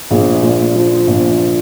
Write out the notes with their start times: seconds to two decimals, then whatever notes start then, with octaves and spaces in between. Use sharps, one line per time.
0.11 A#1 G#4
0.43 A#2
0.76 F3
1.07 A#1